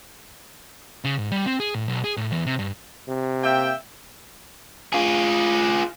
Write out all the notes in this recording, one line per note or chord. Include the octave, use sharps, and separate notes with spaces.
C#3
G#2
G3
C4
G#4
A2
B1
G#4
A2
E2
C3
G2
C3
A#3 E5 G5
F4 G#4